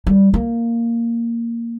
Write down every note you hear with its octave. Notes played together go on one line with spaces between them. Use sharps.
G3
A#3